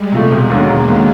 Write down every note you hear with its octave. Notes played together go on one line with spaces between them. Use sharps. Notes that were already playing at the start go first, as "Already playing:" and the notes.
Already playing: G3 G#3
C3 F3 A3
E1
D#2 D3 F#3
E1 A#3
D#2 D3 F#3